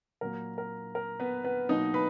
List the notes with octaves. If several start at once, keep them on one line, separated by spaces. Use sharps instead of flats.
A#2 F#3 A#3 A#4
A#4
A#4
B3 B4
B3 B4
B2 F#3 A#3 D#4 D#5
B4 B5